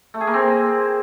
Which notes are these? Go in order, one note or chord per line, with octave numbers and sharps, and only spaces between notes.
A3
G#4
A#3
C4